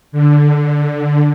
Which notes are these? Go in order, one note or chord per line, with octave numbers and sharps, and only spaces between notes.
D3